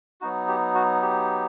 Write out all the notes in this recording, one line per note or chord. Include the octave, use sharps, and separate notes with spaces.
F#3 B3 D#4 F#4
G4
F#4
G4